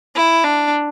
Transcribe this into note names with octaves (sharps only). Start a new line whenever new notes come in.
E4
D4